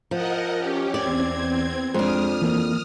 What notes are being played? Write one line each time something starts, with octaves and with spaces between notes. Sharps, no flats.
F3 A#4 D#5 F#5
C#4 G4
E2 C4 D5 G#6
F2 G#3 D4 C5 D#6 F6
E3 A#3